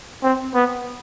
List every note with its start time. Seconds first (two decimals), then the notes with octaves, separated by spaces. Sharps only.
0.23 C4
0.55 B3